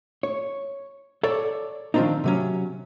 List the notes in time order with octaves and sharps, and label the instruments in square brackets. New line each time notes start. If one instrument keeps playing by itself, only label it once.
[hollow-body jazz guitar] C#5
A4 C#5 D5
D#3 F3 G3 C4 D4 D#4
C3 F#3 C#4